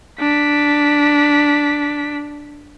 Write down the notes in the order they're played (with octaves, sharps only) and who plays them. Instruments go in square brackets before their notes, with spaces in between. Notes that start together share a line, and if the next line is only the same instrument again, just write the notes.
[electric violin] D4 B6